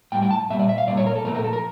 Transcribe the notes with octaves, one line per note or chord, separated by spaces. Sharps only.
A2 G3 G5
G5
A5
A#2 G3 E5
D5
E5
F5
A#2 G3 D5
C#5
A#4
A4
A#2 F3 A3 A#4
A#4
A4
A#4